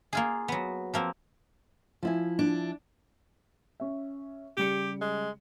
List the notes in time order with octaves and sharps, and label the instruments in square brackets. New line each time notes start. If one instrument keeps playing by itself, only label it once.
[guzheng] A#3 F4 G#4
F#3 B3
F3 A#3 C4
[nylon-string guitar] F3 E4 G#5
[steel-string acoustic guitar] D4
[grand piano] C#4 E5
[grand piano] C#3 G3 C#7 [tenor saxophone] G4
[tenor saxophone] G#3